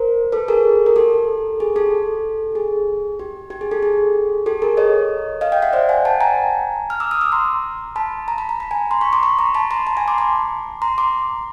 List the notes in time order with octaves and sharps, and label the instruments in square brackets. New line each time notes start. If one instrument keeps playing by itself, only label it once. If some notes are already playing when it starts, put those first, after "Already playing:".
Already playing: [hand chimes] A#4 C5
A4 B4
G#4 A#4
A#4
G4 A4
G#4
G4 A4
G#4
G4
G4
G#4
G4 A4
G#4
G4 A4
G#4 A#4
C#5 D#5
D#5 F5
F5 G5
E5 F#5
C5 D5
F#5 G#5
G5 A5
G#5 A#5
F6
D6 E6
D#6 F6
D6 E6
A#5 C6
A5 B5
A#5
B5
A#5
B5
G#5 A#5
A#5 C6
B5 C#6
C6 D6
B5 C#6
A#5 C6
A5 B5
A#5 C6
A5 B5
G#5 A#5
C6 D6
C6 D6
A#5 C6
C6 D6